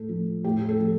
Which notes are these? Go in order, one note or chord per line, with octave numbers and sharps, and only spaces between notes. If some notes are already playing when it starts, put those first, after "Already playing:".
Already playing: A2 A4
F3
A2 G4
A4
F3